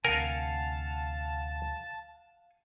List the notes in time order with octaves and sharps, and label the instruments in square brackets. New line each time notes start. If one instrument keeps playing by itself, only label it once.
[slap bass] D2 C3 [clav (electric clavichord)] A#4 [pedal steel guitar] F5 F#5 G#5 [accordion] A5